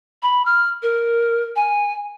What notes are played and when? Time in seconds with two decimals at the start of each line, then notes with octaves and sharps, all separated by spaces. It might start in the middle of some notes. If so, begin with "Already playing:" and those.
0.22 B5
0.45 F6
0.82 A#4
1.56 G#5